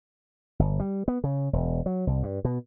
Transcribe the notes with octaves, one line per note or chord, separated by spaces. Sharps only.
G1
G3
B3
C#3
E1
F#3
C2
G2
B2